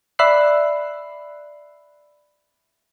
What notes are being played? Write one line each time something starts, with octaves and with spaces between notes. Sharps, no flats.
D5 E5 B5 E6 F#6 C7